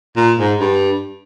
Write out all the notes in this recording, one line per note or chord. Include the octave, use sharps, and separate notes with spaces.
A#2
G#2
G2